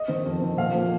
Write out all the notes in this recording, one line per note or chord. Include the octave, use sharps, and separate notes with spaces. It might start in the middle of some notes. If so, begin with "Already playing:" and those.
Already playing: D#5
D#3 C4
F2
D#3 C4
A#2 F5
F3 A#3